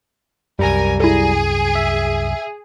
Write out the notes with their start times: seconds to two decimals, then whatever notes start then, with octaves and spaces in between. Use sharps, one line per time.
0.59 C2 F#2 G3 A#4 G#5 A#5 A#6
1.00 E4 G#4 A4
1.75 E5